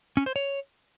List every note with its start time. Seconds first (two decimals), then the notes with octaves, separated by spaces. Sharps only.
0.17 C#4
0.26 C5
0.36 C#5